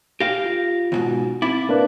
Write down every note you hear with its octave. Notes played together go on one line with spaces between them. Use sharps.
G4 F5 A#6
F4
D#2 G#2 B2
C4 E4 D6 A6
A#3 D4 B4